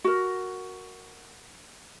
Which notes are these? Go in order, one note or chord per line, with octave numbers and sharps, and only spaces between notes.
F#4 A#4